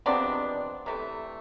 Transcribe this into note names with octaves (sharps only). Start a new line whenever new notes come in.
C3 F3 G#3 B3 C4 D4
C3 E3 A3